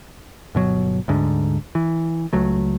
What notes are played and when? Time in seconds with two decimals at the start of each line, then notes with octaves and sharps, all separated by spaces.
0.55 G1 B2 F#3
1.08 D2 G#2 D3
1.75 E3
2.33 C#2 F#3 A3